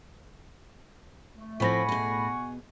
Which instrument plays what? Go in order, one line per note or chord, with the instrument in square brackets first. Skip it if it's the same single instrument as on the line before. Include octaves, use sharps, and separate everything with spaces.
[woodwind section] A3
[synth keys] A2 B5 A#6 [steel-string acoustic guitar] F3 C4 [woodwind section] F#5 G#5 C#6
[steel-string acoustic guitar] B2 G#4